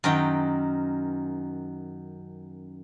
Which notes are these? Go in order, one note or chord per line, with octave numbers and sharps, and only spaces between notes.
F#2 D#3 G5